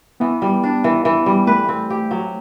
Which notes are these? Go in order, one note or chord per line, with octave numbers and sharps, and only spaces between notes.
E3 B3
G3
D4
E3
E3
G3
A3 B4
C4
G4
F#3